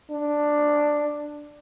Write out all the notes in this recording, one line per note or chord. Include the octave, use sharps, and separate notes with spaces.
D4